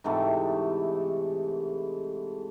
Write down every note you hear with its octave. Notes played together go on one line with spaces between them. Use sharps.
G#2 C3 E3 A3